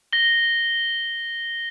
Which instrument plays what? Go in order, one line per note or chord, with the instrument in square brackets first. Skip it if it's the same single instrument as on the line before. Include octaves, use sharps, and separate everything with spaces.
[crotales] A#6 G7